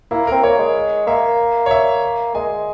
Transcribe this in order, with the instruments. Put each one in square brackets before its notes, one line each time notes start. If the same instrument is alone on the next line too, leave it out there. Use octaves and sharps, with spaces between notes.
[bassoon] A#3 [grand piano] E4
[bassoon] C4 [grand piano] A#4
[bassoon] A#3 [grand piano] C#5
[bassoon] G#3
[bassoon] A#3 [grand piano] E5
[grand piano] C#5
E5
[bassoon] G#3 [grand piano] G#5